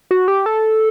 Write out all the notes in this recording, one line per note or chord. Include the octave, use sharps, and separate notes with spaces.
F#4
G4
A4